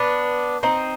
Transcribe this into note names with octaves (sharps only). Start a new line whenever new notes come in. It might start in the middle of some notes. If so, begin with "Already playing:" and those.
Already playing: B3 D4
C4 D#4